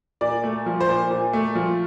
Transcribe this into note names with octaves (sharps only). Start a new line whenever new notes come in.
A#2 D5
A3
F3
C5
A#2
A#2
A3
F3